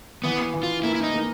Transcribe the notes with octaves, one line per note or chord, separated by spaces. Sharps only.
E3 B3
E3
F4
A#3 E4
E4
D#4
A#3